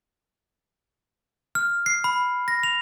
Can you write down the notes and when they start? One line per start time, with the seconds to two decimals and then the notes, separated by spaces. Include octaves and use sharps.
1.55 F6
1.86 C7
2.04 B5
2.48 A#6
2.63 F7